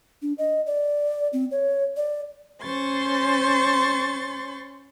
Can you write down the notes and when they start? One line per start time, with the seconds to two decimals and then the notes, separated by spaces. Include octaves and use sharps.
0.22 D4
0.38 D#5
0.66 D5
1.33 C4
1.51 C#5
1.97 D5
2.61 C#4 C5 C6 C#6 A6